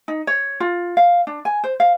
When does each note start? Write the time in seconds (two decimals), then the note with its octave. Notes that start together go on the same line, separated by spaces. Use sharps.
0.08 D#4
0.27 C#5
0.60 F4
0.97 F5
1.27 D4
1.45 G#5
1.64 C5
1.80 F5